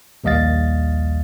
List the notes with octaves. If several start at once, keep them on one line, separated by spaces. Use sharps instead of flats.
A#1 D#2 G3 D#5 F5 A6